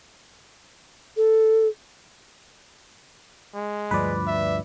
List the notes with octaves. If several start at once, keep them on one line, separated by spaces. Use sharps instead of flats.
A4
G#3
D2 G2 F3 B4 D5
E5